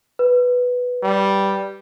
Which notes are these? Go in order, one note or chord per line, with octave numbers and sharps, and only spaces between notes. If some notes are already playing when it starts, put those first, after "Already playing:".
B4
G3